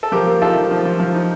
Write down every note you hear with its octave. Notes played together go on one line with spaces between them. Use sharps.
A4
F3 G4 A#4
A#3
D#4 F4 A4
F3
F3
F3
F3
D#4